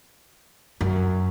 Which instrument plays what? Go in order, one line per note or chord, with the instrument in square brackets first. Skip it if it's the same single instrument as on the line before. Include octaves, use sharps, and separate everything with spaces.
[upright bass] F#2